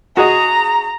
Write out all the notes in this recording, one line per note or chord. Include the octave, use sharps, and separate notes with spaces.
F#4 G#4 D#5 A#5